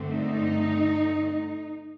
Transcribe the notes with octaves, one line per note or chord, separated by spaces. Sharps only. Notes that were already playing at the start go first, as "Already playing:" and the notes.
Already playing: G2 D3 A3 C4
D#4